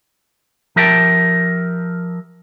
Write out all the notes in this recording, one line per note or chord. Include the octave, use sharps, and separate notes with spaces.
F3 G4 A#4 E5 G5 A5